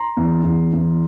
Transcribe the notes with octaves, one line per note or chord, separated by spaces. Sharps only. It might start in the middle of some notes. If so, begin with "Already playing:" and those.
Already playing: A#5 C6
E2
E2
E2